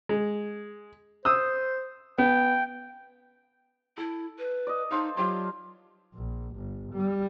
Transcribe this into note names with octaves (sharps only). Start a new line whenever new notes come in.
G#3
C5 D#6 E6
B3 G5
E4 A4
B4
D5 D#5
D#4 A4 C5 F5
F#3 F4 G4 C5
A#1
G1
G3